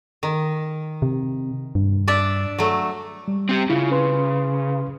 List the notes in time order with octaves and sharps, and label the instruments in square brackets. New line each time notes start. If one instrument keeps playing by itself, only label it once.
[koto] D#3
[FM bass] C3
G2
[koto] D4 D5 E5
F#3 A3
[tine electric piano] G3
[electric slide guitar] C4 G4
[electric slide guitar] C#3 [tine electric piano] E4 F4
[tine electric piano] C#4 B4 C6